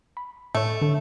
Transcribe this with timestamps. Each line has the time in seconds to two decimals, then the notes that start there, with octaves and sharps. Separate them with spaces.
0.17 B5
0.55 A2 A3 C#5
0.82 D3 A4